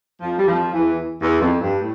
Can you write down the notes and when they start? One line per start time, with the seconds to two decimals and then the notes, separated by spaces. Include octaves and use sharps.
0.21 F2 F3
0.39 G3
0.47 F2 F3
0.74 E2 E3
1.20 E2
1.40 F2
1.60 G2
1.79 A2